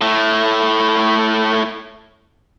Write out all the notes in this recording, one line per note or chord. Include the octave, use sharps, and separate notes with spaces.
A2 A3